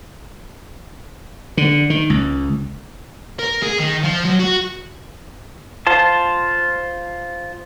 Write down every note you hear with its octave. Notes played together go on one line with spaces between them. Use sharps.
D3
D#3
C#2
A#4
G#4
D#3
F3
F#3
F#4
F4 C5 A5